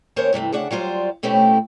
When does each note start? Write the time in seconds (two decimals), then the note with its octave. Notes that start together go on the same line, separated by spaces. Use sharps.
0.16 D#2 C#4 A#4 C5 C#5
0.33 G2 C3 E3 A3
0.52 D2 C#3 D4 E5 F#5
0.71 F#3 G3 F4 C5
1.23 B2 A3 C4 C#4 E4 G4